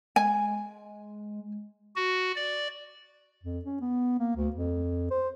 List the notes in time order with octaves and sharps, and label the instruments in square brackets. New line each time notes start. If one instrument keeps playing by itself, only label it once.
[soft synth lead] G#3 [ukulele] G#5
[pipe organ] F#4
D5
[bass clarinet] F2
C#4
B3
A#3
D2
F2
C5